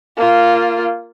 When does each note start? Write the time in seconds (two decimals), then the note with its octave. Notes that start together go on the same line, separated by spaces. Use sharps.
0.17 A#3 F4